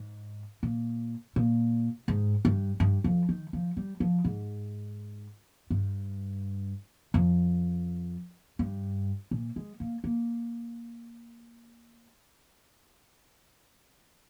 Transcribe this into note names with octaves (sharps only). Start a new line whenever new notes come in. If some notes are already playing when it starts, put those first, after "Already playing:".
Already playing: G#2
A#2
A#2
G#2
G2
G2
F2
D#3
F3
G3
F3
G#2
G2
F2
G2
A#2
G#3
A#3
A#3